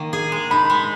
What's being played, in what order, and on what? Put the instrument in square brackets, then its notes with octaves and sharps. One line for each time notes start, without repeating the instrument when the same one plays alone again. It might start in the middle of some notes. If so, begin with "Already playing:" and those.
Already playing: [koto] D#3 A#3
G#4
G#3
[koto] D#4 [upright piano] B5
[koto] G#3